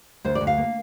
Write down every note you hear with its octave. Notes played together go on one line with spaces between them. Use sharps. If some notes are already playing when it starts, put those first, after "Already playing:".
D2 C5
D5
D2
F5
A#3